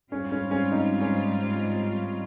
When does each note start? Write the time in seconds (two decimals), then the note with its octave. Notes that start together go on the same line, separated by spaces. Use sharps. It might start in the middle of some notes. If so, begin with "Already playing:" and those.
0.11 G#2 G3 C4 C#4 F4
0.32 C#4
0.51 C#4
0.71 D#4
1.01 C#4